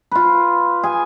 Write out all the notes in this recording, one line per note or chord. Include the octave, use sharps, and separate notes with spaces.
F4 B4
G#4 G#5